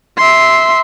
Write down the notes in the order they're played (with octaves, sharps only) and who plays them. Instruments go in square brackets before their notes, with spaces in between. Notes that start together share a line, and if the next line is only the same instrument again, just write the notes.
[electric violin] E5 C6